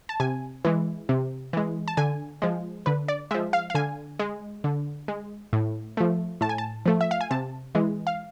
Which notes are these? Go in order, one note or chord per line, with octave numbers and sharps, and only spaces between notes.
A5
C3 G#5
E3 G#3
C3
E3 G#3
A5
D3 G#5
F3 G#3
D3 B4
D5
F3 G#3 E5
F5
F5
D3 G#5
G#3
D3
G#3
A2
F3 A3
A2 A5
G#5
A5
F3 A3
E5
F5
G#5
C3 A5
E3 G#3
F5